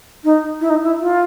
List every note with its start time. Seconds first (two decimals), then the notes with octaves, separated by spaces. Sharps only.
0.24 D#4
0.61 E4
0.70 D#4
0.84 E4
0.99 F4